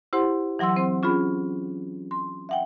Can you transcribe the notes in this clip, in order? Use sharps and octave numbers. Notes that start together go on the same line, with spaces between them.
E4 G4 C5 F#5 C6
E3 F#3 F#5 C6 E6
C4 C5
C#4 F4 G#4 B5
C6
E5 F#5 G5